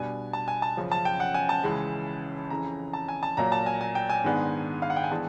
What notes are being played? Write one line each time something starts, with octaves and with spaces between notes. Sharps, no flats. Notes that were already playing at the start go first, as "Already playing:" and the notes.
Already playing: B2 G3 B3 D4 G#5
A5
G#5
A5
F#2 C#3 F3
A5
G5
F#5
G#5
A5
C#2 C#3 E3 G#3
F2 C#3 E3 A#5
A5
G#5
A5
A#2 F#3 A#3 A#5
A5
G#5
G#5
G5
G#5
G#2 D#3 G#3 B3 D4
F5
F#5
G5
G#5
E3 G#3 B3 D4 A5